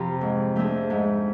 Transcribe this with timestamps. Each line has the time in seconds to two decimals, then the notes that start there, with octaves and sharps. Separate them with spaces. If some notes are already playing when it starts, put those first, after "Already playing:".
Already playing: F2 C3 F3
0.21 G#2
0.55 F3 A3 D4 G#4
0.90 G#2